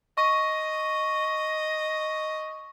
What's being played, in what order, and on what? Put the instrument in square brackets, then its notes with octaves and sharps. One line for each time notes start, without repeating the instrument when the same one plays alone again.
[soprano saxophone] D#5 [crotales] C#6